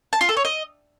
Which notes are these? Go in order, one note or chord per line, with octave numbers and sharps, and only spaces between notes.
A5
F4
A4
C#5
D#5